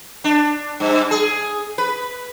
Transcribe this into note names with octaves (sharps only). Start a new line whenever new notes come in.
D4
G2
G#4
B4